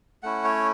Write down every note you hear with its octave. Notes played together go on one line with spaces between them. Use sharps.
A3 C#4 E4 F#5
C#5